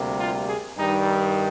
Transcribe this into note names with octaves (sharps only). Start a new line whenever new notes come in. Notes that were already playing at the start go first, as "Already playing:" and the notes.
Already playing: D2 C3 G3 A#3
F4
G#4
G2 D#3 G3 D#4